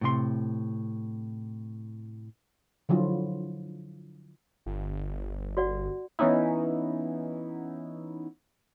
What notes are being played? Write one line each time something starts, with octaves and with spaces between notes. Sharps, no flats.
A2 C3 C6
D3 F3 F#3 E4 F4
G1
F#4 D5 F#5
E3 B3 C#4 D#4 E4